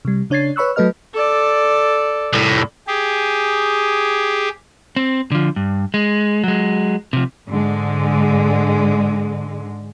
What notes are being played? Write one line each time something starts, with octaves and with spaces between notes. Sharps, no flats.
C3 G3
C#3 D4 C#5 G#6 A6 C7
B4 C#5 B5 C#6 E6 F#6
F#3 A3 A4 B4 D#5 F6
A4 D5
C2 A2
G4 G#4
C4
D3 F3
G2
G#3
F#3 G#3
C3 F3
G#2 D3 G#3